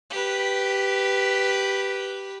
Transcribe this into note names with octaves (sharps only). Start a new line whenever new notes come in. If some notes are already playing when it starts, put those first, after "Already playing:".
G4 B4